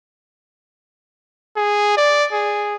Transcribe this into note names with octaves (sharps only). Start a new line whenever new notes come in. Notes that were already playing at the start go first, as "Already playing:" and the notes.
G#4
D5
G#4